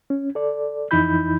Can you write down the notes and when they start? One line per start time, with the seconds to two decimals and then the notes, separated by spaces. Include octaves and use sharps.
0.10 C#4
0.35 A4 D5
0.91 F2 E3 D#4 E4 B5 G6